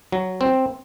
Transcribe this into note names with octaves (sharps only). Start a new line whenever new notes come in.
F#3
C4